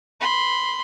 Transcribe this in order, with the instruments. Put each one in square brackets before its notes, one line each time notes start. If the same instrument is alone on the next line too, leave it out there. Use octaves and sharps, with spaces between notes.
[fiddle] B5 C6